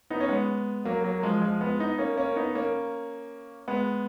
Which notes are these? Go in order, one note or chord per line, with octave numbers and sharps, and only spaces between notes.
B3 D#4
C#4
G#3 B3
F#3 A#3
F#3 A#3
F3 G#3
F3 G#3
G#3 B3
B3 D#4
A#3 C#4
A#3 C#4
B3 D#4
A#3 C#4
G#3 B3